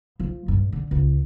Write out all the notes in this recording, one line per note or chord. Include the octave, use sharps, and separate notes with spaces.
F3
G2
D3
C#2